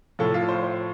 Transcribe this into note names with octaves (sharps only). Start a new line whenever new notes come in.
A2 F3 A4
F4
C5
C5